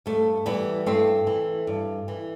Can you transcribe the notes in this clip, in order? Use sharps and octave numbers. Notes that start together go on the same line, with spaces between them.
G2 A3
E3 G3 B3
G2 A3 C4
E3
G2
E3